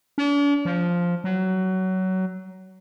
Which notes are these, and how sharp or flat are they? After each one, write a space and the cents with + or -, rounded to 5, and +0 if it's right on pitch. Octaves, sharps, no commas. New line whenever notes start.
D4 -45
F3 +0
F#3 +20